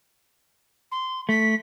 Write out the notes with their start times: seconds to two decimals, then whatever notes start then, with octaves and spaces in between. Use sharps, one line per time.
0.91 C6
1.29 A3 B6